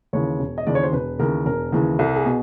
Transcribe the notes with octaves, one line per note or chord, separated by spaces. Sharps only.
D#2 C#3 E3 C#5
E1
D#5
D#2 C#3 E3 D5
C#5
C5
E1 B4
D#2 C#3 E3 A#4
E1 A#4
D#2 C#3 E3
C2 A4
G#4
B2